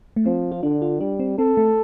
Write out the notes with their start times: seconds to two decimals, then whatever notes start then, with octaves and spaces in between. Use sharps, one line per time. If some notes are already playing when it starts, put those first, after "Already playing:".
0.16 A3
0.26 F3 C4
0.52 F4
0.63 D3 D4
0.82 F4
1.00 G3 D4
1.20 C4
1.38 C4 A4
1.57 A3